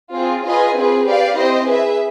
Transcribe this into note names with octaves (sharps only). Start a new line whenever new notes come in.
C4 F4 G#4
F4 G#4 B4 D#5 G#5
C4 F4 G#4 B4
G4 B4 D5 F5
C4 E4 G4 C5 D#5
G#4 B4 E5